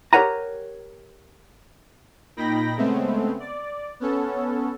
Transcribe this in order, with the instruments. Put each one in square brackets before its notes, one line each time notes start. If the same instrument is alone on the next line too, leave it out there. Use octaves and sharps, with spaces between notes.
[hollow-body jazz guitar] G4 A#4 C#5 F#5 G#5 A#5
[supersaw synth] A#2 D#4 G5 B5 A#6
C#3 G#3 A3 B3 C4
D5
B3 C#4 A4